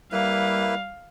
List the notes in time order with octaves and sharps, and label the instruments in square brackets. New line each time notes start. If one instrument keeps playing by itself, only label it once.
[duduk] G3 [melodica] A#3 E4 B4 [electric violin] F5